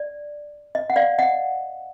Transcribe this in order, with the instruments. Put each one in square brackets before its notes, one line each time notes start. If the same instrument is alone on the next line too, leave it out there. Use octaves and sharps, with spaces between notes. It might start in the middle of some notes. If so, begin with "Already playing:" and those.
Already playing: [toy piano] D5
D#5
F#5
D5 F5
D#5 F#5